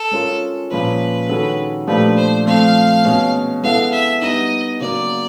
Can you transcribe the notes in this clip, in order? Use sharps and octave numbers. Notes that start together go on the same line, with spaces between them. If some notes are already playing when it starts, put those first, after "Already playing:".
Already playing: A4
G#3 C#4 F4 A#4
A#2 F3 G#3 C#4 F4 B4
D#3 G#3 C#4 F#4 A4
A#2 F3 A3 D4 G4 B4
C5
F3 A3 C4 F5
B2 G#3 C#4
G#3 B3 E4 A4 F5
E5
G3 B3 D#4 D#5
C#3 F#3 A#3 D5